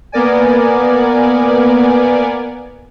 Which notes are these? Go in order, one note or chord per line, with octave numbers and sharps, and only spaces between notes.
A#3 B3 A#4 D5 G#5